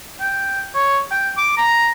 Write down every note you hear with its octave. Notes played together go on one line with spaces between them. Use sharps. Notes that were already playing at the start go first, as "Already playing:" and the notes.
G5
C#5
G5
D6
A#5